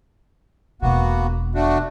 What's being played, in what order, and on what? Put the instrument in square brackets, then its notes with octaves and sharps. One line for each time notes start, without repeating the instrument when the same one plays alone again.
[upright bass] E1 B2 [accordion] A#3 B3 F#4
[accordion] A3 D4 F#4